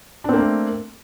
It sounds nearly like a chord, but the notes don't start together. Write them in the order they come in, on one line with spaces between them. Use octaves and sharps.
D4 C4 A#3 A3